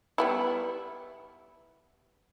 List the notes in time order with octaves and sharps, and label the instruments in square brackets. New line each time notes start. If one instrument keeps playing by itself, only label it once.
[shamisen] G3 B3 E4